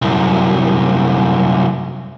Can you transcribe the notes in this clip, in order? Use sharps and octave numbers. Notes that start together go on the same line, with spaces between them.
C2 F#2